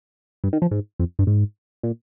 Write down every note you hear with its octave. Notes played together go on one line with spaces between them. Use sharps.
G2
D#3
F3
G#2
F2
G2
G#2
A#2